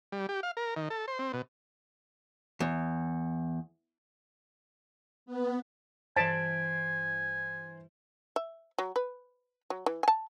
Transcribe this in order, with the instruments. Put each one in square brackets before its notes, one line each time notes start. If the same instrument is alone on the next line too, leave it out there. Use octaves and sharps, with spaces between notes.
[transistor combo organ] G3
G4
F5
A#4
D#3
A4
C5
C4
B2
[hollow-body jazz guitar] E2
[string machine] B3
[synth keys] G2 E3 [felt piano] C5 B6 D7 [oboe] G#5 [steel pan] A5
[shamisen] E5
F#3
B4
F#3
E3
G#5 A5